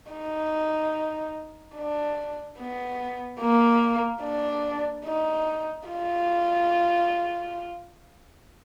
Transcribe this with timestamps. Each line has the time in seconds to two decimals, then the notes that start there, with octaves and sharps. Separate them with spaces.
0.11 D#4
1.76 D4
2.59 B3
3.41 A#3
4.23 D4
5.06 D#4
5.89 F4